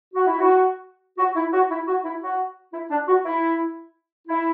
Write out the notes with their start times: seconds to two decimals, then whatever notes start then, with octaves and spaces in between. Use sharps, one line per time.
0.14 F#4
0.27 E4
0.39 F#4
1.18 F#4
1.35 E4
1.52 F#4
1.70 E4
1.87 F#4
2.04 E4
2.21 F#4
2.73 E4
2.90 D4
3.07 F#4
3.24 E4
4.28 E4